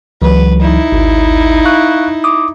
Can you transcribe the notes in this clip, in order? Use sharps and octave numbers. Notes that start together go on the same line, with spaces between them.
C#2 E3 F#3 B4
D#4 E4
G#1 D2
F5 C#6 F#6
D6 D#6